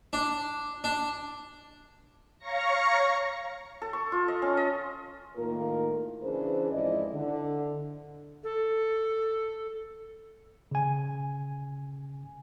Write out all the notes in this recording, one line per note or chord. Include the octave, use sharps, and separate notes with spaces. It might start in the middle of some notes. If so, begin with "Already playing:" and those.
D4
D4
C#5 F5 A#5 C#6 A#6 C#7
A4
C#6
F4
D#5
C#4
D#5
A2 D#3 A#3 F4 A#4
C#3 E3 D4 G#4 B4 C5
F2 G#2 E4 D5 D#5
D3
A4
C#3 G#5